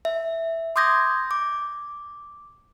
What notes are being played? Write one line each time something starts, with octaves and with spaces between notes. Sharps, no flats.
E5
C6 D6 D#6 G6 G#6 A#6
D6